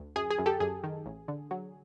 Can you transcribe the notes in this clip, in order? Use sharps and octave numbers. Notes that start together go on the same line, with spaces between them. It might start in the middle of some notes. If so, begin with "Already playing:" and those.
Already playing: D2
F#2 G#4
G#4
F#2
G4 A4
F#2 G#4
D#3
A1
D3
F#3